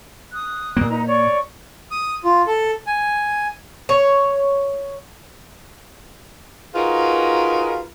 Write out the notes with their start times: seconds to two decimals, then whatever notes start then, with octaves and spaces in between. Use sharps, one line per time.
0.32 D#6 F#6
0.77 A#2 A#3
0.89 D#4 B4 A#5
1.07 C#5 D5 C#6
1.91 D#6
2.24 F4
2.47 A4
2.87 G#5
3.89 C#5
6.75 D#4 F4 F#4 G#4 A#4 B4